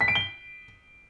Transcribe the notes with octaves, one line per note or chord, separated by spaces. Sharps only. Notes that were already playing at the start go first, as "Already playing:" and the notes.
B6
D7
G7